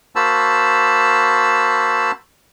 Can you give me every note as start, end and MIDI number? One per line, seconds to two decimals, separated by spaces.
0.16 2.11 58
0.16 2.11 66
0.16 2.11 72
0.16 2.11 81
0.16 2.11 83
0.16 2.11 88